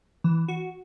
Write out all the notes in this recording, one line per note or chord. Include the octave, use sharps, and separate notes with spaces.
E3
F#4